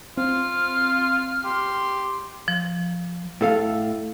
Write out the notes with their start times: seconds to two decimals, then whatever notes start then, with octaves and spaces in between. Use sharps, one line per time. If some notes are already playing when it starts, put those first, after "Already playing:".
0.17 C4 F4 F6
1.44 G4 C6
2.48 F3
3.41 A2 A4 F5